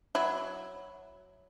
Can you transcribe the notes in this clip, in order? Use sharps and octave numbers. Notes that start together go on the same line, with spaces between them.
F#3 E4